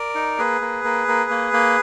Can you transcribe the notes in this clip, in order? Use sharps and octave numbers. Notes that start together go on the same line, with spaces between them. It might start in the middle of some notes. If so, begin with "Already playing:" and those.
Already playing: A#4 D5
D#4
A#3 G#4 B4
A#3
A#3
A#3
A#3
A#3